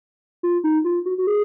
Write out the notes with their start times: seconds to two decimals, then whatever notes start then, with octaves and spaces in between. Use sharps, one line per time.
0.43 F4
0.64 D#4
0.85 F4
1.06 F#4
1.18 F#4
1.27 G#4